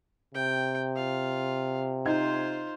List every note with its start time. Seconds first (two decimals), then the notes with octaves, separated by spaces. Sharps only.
0.35 C3 G5
0.96 F4 F5
2.05 D#4 F4 C5 G#6